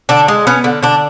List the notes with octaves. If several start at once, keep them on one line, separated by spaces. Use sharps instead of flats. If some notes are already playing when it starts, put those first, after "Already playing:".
D3 D4
G#3
B3 C#4
D3
D3 D4